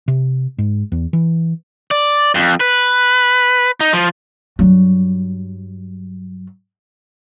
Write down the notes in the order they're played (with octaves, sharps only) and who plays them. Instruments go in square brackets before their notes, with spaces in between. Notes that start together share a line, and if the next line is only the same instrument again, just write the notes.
[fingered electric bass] C3
G#2
E2
E3
[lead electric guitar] D5
F2
B4
D#4
F3
[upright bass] G2 F#3